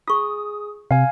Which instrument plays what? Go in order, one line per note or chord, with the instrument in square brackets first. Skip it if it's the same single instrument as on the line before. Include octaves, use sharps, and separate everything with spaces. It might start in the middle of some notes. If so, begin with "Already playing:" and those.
[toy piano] F4 C#6 [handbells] G#4 D#6
[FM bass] C3 [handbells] F5 G#5